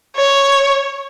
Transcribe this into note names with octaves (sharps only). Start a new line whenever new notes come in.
C#5